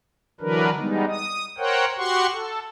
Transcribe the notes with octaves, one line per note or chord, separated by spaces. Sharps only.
D3 E3 F#3 D4 A#4 B4
G3 G#3 B3 D#4
D#6
A#4 C5 C#5 F#5 G5
F#4 G4 F#5 C6 C#6
A4